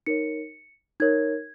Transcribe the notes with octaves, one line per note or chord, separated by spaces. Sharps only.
D#4 A#4 C#5 C#7
D#4 A#4 C#5 G#6